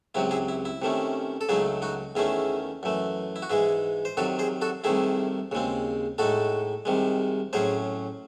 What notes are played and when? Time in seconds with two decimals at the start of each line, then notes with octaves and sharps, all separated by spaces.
0.15 C#2 C3 F#3 C4 E4
0.31 E4 G#4
0.48 E4
0.65 E4
0.82 C3 D#3 A3 C#4
1.41 A4
1.49 C#2 C#3 F#3 A3 D#4 E4 G#4
1.82 D#4 F#4
2.15 E2 D#3 A3 C#4 E4 G#4
2.83 F#2 E3 A3
3.36 E4
3.42 F#4
3.50 G#2 E3 G#3 E4 G#4
4.05 C5
4.17 C3 D#3 F#3 F#4 A4
4.39 G#4 C5
4.61 F#4 A4
4.84 C2 C3 D#3 A3 E4 G#4
5.51 D#2 C#3 G#3 C4
6.18 A2 G#3 D#4 F#4 A4
6.85 C2 C3 D#3 G#3
7.53 A2 F#3 C#4 G#4 C5